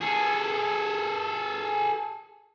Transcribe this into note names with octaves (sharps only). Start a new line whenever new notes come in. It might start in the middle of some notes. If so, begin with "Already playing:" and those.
G#4 A4